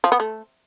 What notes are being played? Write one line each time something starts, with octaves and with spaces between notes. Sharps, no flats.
F3
B3
A3